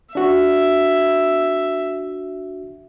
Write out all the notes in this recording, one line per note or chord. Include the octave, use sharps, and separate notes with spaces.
D4 F#4 E5